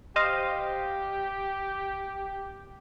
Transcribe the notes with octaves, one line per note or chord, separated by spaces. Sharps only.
G4 C5 D#5 F5